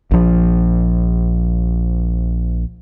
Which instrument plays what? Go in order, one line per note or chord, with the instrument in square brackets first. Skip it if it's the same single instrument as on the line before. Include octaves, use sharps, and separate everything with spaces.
[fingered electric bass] A#1 F3